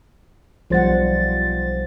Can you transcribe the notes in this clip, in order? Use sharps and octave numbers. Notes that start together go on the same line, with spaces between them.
B1 F3 G3 C5 F#5 A6